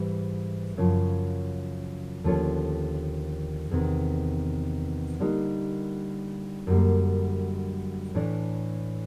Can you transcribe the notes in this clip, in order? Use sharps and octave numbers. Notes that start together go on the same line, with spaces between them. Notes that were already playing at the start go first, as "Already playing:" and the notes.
Already playing: G#2 E3 G3
F#2 C#3 F3
D#2 D3 F3 A3 C#4
E2 C3 D#3
D3 G3 A#3 D#4
F#2 D3 G3 A#3
A2 E3 A3 D4